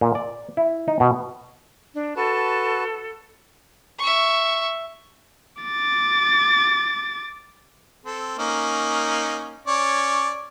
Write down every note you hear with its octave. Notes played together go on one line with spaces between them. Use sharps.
A#2
D5
E4
D#4
B2
D4
F#4 A4 B4 A5
E5 C#6
D6 A6
C4 A4
A#3 C#4 D#4
C#4 C#5 D5